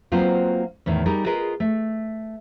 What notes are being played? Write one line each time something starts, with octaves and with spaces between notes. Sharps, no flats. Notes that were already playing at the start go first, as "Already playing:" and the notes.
F#3 A#3 C4 F4 B4 C5
E2 A2 D#3
G3 D#4 G#4 A#4
F4 G#4 A#4 B4 D#5
A3